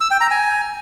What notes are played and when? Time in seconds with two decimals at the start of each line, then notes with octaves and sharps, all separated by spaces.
0.01 E6
0.11 G5
0.21 A#5
0.31 G#5